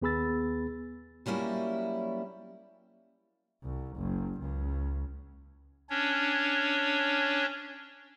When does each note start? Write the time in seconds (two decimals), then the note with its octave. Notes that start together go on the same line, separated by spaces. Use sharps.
0.02 D#2 B3 G#4 B5 E6 A6
1.26 F#3 G3 A#3 C#4 E4
3.63 C2
3.97 F#1
4.40 C#2
5.90 C#4 D4 C#5